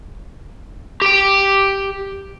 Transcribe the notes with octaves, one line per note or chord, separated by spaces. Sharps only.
G4 G5